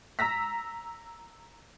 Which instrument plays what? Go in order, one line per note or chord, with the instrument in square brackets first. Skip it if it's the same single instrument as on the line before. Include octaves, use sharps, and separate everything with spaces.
[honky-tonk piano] A#5 E6 A#6 B6